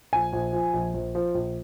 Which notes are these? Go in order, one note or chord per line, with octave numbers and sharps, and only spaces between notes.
A#1 G#5
A#1
F3
A#1
A#1
F3
A#1